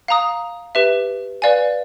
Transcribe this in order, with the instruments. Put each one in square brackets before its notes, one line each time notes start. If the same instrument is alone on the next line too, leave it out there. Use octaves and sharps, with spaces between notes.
[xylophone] F5 A#5 D#6
G4 B4 E5
B4 D5 F5 G#5